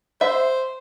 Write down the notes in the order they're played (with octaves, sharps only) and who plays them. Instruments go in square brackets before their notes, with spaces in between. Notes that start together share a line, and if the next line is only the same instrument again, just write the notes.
[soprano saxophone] C5 [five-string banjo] E5